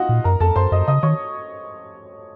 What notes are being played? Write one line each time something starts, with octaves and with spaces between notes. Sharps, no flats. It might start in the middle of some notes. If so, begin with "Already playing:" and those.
Already playing: D#4 F4 F#4 D#5 F#5
A#2
F#2 A#4 A#5
F2 A4 A5
F#2 C5 C6
F#2 D#5 D#6
C#3 D#5 D#6
D#3 C#5 C#6